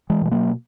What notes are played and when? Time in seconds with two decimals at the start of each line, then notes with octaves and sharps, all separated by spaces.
0.10 E3 G#3
0.22 B2 G#3
0.31 F#3 A#3